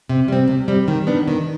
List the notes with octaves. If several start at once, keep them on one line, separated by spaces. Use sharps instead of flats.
C3
G3 C4
C3
G3 C4
D#3
B3 D4
D#3